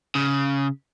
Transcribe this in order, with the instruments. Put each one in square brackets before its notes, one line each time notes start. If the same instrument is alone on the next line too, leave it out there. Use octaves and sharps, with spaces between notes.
[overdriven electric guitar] C#3